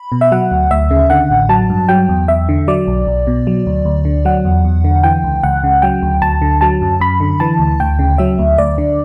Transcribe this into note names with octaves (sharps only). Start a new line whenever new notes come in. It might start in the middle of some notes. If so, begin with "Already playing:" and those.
Already playing: B5
B2
E5
F#3 F#5
D2
D2 E5
C#3
D3 F#5
A1
F#3 A5
G2
F#3 G5
E2
E2 E5
D3
F#3 D5
B1
B1
B2
F#3
D2
D2
D3
F#3 F#5
E2
E2
D3
E3 G5
C#2
C#2 F#5
C#3
F#3 G5
D2
D2 A5
D3
F#3 A5
F#2
F#2 B5
D3
E3 A5
D2
D2 G5
C#3
F#3 E5
D2
D2 D5
D3